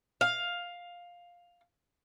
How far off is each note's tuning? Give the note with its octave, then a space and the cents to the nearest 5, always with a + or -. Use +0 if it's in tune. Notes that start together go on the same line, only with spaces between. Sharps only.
F5 +10